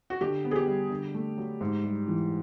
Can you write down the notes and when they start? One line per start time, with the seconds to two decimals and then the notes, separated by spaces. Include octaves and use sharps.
0.10 F#4
0.21 D3 G4
0.44 B3
0.51 G#4
0.56 G4
0.67 G3
0.90 D3
1.14 A3
1.38 F#3
1.61 G#2
1.84 G3
2.08 E3